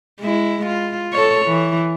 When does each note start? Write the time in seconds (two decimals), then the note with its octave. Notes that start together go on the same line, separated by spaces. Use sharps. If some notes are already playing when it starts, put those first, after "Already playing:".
0.20 G#3 E4
0.66 F4
1.13 A4 C#5
1.46 E3